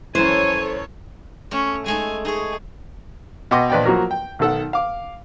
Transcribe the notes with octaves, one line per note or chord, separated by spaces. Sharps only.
F#2 E3 A4 C5 C#5 G#5
A3 C#4
G#3 A3 D#4 G#5
D#4 G#4 C#5
B2 D#5 G5 C6 D6
A#1 B4 D5 D#5 G5
F3 F#3 A#3 F#4 A#4
G5
B1 D#3 A4 F#5
F5 D6